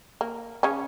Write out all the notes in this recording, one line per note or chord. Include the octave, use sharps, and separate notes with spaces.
A#3
C#3 C#4